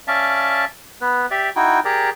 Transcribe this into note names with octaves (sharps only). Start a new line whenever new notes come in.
C#4 D5 E5 F5 A5
B3 B4
G4 D5 E5
D#4 E4 F#4 G5
G4 G#4 A#4 D5